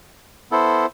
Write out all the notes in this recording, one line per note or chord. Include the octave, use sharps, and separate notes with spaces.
B3 E4 A4 C5